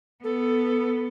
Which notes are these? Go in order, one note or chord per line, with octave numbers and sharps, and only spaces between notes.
B3 A4